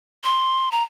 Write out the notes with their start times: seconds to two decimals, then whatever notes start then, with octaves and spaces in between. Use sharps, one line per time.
0.24 C6
0.72 A#5